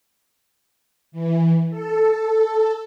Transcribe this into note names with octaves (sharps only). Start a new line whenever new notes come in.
E3
A4